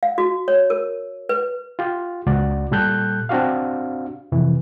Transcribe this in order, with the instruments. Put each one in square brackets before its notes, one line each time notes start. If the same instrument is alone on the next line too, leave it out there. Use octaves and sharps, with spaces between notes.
[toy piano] F5
F#4
C#5
A#4
B4
[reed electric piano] F4 G4
C#2 F#4 D5
A#2 G3 G4 A4 F#6 G6
C4 D4 F#4 G4 F5
F2 C3 E3